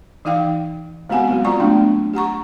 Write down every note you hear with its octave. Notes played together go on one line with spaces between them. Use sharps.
E3 D#4 F5 G5
G#3 B3 C4 F#4 F#5 G#5
F#3 G#3 A#3 F#4
C4 F4 D5 A#5 C#6
F#3 A3 B3 D4
G4 F#5 A#5 C#6